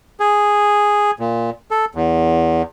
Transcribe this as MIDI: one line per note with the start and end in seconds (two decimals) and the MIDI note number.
0.20 1.11 68
1.19 1.50 46
1.71 1.85 69
1.95 2.62 40